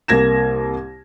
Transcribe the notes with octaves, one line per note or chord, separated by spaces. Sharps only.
C2 A#3 G#6 A#6 E7